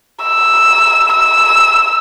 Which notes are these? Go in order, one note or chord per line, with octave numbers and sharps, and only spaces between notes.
E6
E6